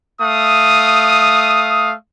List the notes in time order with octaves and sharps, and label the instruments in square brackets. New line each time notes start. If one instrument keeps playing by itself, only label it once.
[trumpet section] A3 F5 D#6